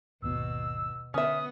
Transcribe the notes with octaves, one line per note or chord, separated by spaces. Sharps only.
G#1 D#2 B2 B3 E6
D3 B3 C#4 E5 D#6